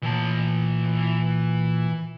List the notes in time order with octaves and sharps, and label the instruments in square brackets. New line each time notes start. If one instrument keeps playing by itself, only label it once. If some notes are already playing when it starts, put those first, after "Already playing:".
[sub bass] A#2 [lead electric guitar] E3 A5